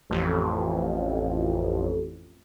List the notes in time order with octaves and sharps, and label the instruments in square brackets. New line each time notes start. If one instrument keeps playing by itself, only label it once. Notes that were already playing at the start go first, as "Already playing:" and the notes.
[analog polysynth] A1 F2